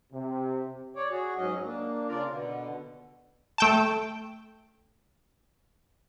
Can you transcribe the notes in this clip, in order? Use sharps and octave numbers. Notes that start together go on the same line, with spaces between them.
C3
C#5 D5
F#4 G#4
G#2 F#3 C#4 D#5
A#3 D4
C#3 F4 A#4 D5 A#5
B2 D3
A3 G5 A5